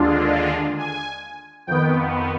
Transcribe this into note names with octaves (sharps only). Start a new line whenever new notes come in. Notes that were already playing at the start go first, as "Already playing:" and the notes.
Already playing: D#2 D3 G#3 D4 F4
G#5
F2 D#3 B3 G5